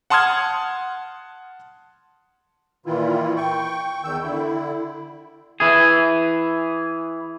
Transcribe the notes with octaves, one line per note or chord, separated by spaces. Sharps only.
F#5 A5 C6 D#6 F6 G#6
A#2 D#3 E3 E4 F4
G5 C#6
E2 D#3 E6 G6
D3 E4
E3 G#4